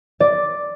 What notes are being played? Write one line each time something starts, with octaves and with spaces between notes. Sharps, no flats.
D5